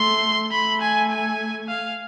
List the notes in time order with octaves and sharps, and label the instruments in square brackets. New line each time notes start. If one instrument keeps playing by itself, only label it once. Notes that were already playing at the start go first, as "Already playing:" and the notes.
Already playing: [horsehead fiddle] A3 [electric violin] C6
[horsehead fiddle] A3 [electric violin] B5
[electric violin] G#5
G#5
F5